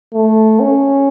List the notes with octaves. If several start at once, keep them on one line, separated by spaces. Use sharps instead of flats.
A3
C#4